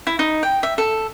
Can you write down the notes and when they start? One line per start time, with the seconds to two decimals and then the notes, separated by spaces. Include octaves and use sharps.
0.07 E4
0.19 D#4
0.43 G5
0.63 E5
0.78 A4